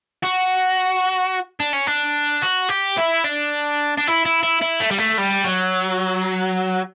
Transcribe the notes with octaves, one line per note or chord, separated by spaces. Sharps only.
F#4
D4
C#4
D4
F#4
G4
E4
D4
D4
E4
E4
E4
E4
A3
G3
A3
G3
F#3